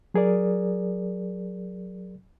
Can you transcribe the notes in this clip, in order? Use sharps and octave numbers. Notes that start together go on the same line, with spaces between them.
F#3 G#4 A#4 D5